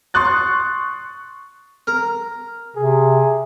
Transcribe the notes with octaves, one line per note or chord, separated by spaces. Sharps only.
C6 C#6 D#6 F#6 A6
A#4
C3 G#4